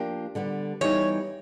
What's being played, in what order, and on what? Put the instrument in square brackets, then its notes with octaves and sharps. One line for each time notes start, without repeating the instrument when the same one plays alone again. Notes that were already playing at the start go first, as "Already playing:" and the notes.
Already playing: [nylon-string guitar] F3 A#3 D4 G4
D3 G3 B3
[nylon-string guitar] E3 G3 B3 D#4 [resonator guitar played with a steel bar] C#5